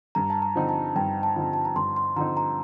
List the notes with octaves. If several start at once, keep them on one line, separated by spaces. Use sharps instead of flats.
G2 A#5
A5
A#5
D3 F3 C4 D#4
A5
G2 G5
A5
D3 F3 C4 D#4
A5
A#5
G2 C6
C6
D3 F3 C4 D#4 A#5
A#5